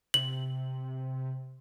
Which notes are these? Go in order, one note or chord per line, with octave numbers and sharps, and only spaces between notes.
C3 F#7